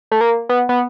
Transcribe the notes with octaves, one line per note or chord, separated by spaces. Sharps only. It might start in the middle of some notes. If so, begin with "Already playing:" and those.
A3
A#3
B3
B3